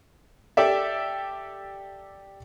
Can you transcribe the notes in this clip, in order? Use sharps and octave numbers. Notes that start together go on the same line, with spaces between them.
G4 A4 D5 E5